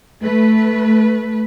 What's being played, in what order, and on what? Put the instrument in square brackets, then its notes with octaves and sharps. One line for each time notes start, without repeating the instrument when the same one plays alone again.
[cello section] A3 B4